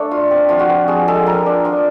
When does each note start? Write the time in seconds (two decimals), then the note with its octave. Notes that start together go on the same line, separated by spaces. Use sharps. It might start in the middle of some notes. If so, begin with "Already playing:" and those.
Already playing: A3 D4 A4
0.11 F4
0.31 C4
0.49 F3 F4
0.59 F#4
0.69 C4
0.88 F3 G#4
1.08 G#3 A4
1.26 F3 A#4
1.46 D4
1.65 F3